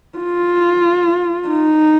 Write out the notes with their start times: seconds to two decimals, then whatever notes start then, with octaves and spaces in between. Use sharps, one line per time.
0.18 F4
1.49 D#4